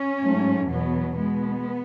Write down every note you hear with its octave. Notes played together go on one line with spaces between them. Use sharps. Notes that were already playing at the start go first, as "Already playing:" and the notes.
Already playing: C#4
G#2 F#3 A3
E2 B2 F#3 B3
B2 G#3 B3